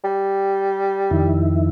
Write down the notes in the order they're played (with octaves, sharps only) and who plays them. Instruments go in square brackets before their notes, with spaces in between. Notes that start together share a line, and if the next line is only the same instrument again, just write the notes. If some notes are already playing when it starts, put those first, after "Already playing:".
[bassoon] G3
[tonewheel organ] F2 D#3 E4